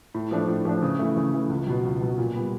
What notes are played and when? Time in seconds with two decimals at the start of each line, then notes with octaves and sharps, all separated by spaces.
0.14 A2
0.31 F3 A3 D4
0.48 A2
0.65 F3 A3 D4
0.82 C#3
0.99 E3 A3
1.17 C#3
1.33 E3 A3
1.50 C#2
1.67 B2 F#3
1.85 C#2
2.01 B2 F#3
2.18 A#2
2.35 G3 B3